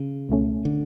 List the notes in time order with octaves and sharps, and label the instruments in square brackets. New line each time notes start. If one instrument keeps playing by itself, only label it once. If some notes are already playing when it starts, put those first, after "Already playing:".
Already playing: [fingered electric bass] C#3
[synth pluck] C#2 B2 A3 C#4
[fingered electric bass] D3